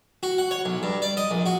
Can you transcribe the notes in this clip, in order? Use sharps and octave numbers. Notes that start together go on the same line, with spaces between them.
F#4
F#5
C#5
B1
G2
D5
D#5
A#1
F#4